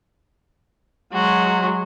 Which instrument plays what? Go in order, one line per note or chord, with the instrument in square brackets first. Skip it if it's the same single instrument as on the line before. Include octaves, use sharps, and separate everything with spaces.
[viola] F#3 G#3 [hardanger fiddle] F#4 C6